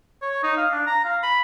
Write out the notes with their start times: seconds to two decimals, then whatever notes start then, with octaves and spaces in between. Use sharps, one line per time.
0.22 C#5
0.43 D#4
0.57 F5
0.72 D4
0.87 A#5
1.05 F5
1.23 B5